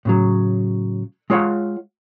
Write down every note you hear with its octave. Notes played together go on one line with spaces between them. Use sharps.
A2 C#3 F#3
G#3 F4 C#5 F5 F#5